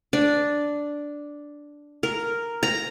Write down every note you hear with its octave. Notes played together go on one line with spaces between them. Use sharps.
D4
A#4
A#5